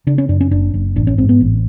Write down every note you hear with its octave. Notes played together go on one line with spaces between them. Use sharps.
C#3 D4
C#4
F#2 D4
C#4
F#1 D4
F#1
A1 D4
C#4
G#2 C4
B3
A1